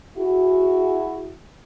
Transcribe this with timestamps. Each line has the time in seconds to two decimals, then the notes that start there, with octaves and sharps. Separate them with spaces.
0.17 E4 F#4 G#4